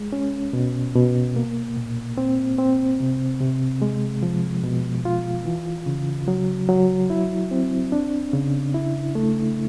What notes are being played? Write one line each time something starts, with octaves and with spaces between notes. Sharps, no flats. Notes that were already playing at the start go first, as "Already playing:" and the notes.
Already playing: G#3
C#4
B2
B2
A#3
A#2
C4
C4
C3
C3
G#3
F3
B2
F4
E3
C#3
F#3
F#3
E4
C4
D4
C#3
E4
A3